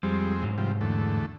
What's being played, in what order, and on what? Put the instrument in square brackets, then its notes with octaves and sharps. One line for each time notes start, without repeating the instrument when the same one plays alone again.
[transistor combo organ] F2 G#3 C4 [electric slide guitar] G3
[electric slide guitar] G#2 F#3
[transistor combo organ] C3 F3 G3
E2 D3 A3